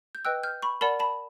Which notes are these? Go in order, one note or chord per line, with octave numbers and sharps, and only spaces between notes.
G6
B4 D#5 G5 E6 F#6
F6 G6
B5 C#6
A#4 D5 F#5 A5 B5
A5 B5